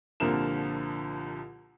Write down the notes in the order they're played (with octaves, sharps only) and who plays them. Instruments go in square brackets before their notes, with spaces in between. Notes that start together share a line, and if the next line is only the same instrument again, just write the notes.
[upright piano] C2 A#2 D3 F3 A#4 E7